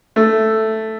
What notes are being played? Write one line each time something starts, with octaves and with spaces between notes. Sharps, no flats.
A3